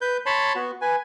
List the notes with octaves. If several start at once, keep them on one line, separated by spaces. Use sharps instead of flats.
B4 G6
C#5 A5 B5 C6
B3 F#4
B4 G#5